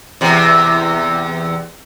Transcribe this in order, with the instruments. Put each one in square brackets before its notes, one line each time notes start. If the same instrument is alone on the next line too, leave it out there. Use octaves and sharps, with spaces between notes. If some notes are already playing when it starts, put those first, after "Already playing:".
[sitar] E2 C3